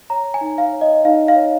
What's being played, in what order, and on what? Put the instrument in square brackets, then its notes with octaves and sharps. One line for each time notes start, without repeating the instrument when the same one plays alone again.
[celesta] C#5 A#5
G#5
D#4
F5
C#5
D#5
D#4 F5
F5
C#5